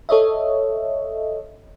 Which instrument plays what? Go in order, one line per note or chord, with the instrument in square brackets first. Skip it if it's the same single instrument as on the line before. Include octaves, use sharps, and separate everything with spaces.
[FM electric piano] A4 C#5 D#5 E5